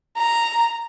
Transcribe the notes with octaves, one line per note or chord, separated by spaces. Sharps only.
A#5